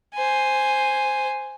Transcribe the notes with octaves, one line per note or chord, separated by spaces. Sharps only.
C5 G#5